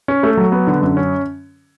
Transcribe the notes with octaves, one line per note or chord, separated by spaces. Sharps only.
C#4
A3
F#3
B3
D3
F#2
C#4